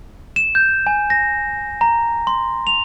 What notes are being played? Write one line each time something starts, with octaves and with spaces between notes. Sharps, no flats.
E7
G6
G#5
A#6
A#5
C6
F7